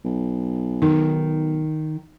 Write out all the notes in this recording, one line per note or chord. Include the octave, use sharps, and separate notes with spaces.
B1
D#3 D#4